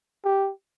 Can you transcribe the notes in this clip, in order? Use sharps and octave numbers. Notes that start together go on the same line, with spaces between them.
G4